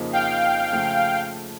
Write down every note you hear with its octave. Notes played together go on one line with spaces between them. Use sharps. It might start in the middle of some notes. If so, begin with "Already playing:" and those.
Already playing: F2 C#3 F3 A#3 D#4
F5 G5
C#3 F3 A3